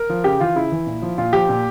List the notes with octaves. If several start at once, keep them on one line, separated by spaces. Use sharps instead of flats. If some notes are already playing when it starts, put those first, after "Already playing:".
Already playing: A#4
F3
C#3 G4
E3 F4
C#3 E4
E3
A#2
F3
A#2 F4
F3 G4
A#2